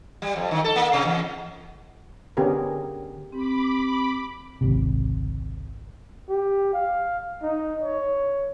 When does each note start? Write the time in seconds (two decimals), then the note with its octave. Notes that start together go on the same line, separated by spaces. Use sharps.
0.22 G3
0.36 F2
0.51 D#3
0.64 A4
0.76 A#3
0.93 C3
1.05 E2
2.37 D3 B3 C#4 G4 G#4 A#4
3.32 C4 G4 B5 D6
4.61 G#1 C#2 C3
6.29 G4
6.73 F5
7.42 D#4
7.82 C#5